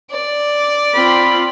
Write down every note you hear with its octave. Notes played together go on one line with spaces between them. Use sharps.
D5
C4 F4 B5